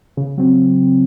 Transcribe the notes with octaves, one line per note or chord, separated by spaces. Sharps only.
C#3
F#3 C4